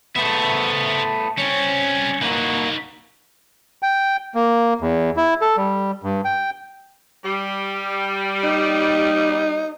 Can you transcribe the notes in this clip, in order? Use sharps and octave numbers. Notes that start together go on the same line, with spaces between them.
A3 B3 C5 E5
G3 C4 C#4
A#3 D#4 F#4 B4
G5
A#3
E2
E4
A4
G3
G2
G5
G3
D#4